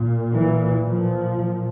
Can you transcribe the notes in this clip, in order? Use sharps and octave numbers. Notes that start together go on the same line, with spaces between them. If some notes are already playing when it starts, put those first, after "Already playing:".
Already playing: A#2
E3
F3
A#2